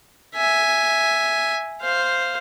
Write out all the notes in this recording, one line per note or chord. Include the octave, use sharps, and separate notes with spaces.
E5 G#5
C5 F5